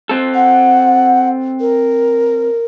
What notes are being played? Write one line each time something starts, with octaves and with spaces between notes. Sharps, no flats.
C4 A4
F#5
A#4